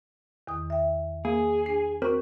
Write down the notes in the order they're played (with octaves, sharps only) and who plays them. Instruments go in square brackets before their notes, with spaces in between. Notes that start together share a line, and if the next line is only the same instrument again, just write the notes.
[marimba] E2 D#3 D#6
E5 G5
[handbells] A#3 [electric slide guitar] G#4
[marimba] D4 [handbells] C7
[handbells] C4 A#4 C5 [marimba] F#4 C#6